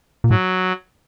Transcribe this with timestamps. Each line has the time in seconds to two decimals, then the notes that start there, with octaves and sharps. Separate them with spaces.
0.24 A#2
0.30 A2 F#3